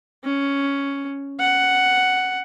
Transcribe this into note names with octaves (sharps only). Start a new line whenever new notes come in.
C#4
F#5